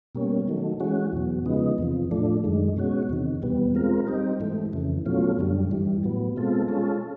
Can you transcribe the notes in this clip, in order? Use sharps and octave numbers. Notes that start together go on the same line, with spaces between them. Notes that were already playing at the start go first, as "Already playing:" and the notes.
B2 G3 A#3 C#4
D#3 F#3 A3
E3 G#3 C#4 F#4
E2 B2 F#3
C#3 F3 G#3 B3 D#4
E2 C3 F3
A2 F3 A3 D4
F#2 D#3 G#3
B2 G#3 C#4 F#4
E2 C3 D#3
E2 B2 G3 B3
G#3 C4 F4 A#4
G3 C4 D#4 G4
G#2 E3 A3
F2 C#3 E3
B2 F#3 A3 C#4 F4
F#2 D3 G3
G2 E3 G3
A2 F#3 B3
B2 G#3 C4 F4 A4
G#3 C#4 F4 A4